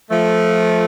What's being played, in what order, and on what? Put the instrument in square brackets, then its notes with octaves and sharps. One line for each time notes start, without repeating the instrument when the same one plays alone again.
[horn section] F3 A3